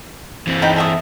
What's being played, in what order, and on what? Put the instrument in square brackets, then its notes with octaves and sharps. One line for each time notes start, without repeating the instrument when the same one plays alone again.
[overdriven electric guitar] E3 C4
[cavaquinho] D#4 G5 B5
A4 E5 D#6